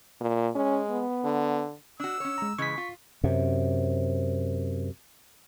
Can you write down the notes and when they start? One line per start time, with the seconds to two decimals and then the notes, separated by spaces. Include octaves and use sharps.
0.21 A#2
0.55 G#3 C#4
0.91 B3
1.24 D3
2.00 D4 F#4 E6
2.20 C#4 C#5
2.38 G#3 A#5
2.58 C#3 E3 G#3 C#6 B6
2.78 F4
3.24 F#2 C3